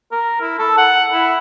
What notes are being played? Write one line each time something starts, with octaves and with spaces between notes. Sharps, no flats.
A#4
E4
A4
F#5
E4